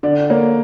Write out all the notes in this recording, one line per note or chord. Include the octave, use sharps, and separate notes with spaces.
D3 D5
A#3 C#5